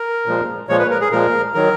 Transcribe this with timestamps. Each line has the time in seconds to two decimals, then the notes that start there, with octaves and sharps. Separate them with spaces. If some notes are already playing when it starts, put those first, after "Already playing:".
Already playing: A#4
0.26 A#2 F3 G#3
0.68 A#2 F3 G#3 C#5
0.80 B4
0.90 A#4
1.01 G#4
1.12 A#2 F3 G#3 A#4
1.54 D#3 F#3 A#4